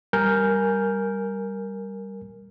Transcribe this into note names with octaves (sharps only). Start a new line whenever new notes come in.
G3 A#4 G#5 F6 G6